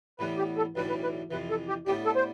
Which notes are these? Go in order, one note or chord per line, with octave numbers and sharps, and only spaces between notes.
A2 E3 G3 B3 B4
G4
A4
B1 A2 E3 G3 D4 B4
B4
B4
F2 C3 E3 B4
A4
G4
A2 G3 B3 D4 G4
A4
C5